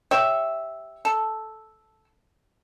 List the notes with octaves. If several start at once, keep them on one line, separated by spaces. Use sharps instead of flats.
G4 C#5 E5
A4